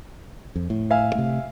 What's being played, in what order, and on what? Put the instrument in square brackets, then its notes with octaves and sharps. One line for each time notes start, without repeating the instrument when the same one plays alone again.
[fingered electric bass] F2
A2
[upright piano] E5 F5 G#5
[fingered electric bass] C3 A3